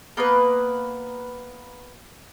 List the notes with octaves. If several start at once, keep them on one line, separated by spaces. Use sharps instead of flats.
A#3 B3 A#4 B4